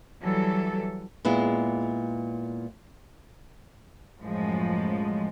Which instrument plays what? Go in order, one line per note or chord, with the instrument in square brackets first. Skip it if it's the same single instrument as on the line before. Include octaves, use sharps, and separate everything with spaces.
[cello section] E3 F#3 G3 A4
[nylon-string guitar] A#2 G#3 B3 E4
[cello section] F#2 A2 F3 G#3